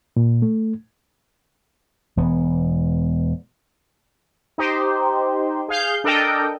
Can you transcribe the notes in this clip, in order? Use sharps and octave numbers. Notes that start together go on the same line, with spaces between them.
A#2
A3
E1 E3 B3
D#4 G4 C5
G#4 F5 G6
D4 A4 A#4 D#5 G5